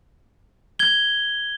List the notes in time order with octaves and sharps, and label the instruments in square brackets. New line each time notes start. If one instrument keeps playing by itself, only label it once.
[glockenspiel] G#6 G7